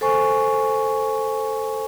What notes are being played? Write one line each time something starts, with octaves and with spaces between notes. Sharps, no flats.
A4 C5 G#5 C#6